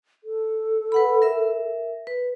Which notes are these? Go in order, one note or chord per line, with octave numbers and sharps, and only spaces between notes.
A4
B4 F#5 B5
A#4 E5
B4